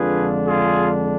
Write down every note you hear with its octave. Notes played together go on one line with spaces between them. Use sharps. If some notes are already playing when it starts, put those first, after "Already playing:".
Already playing: F2 D3 G#3 D4 F4 G#4 B4
F4 G#4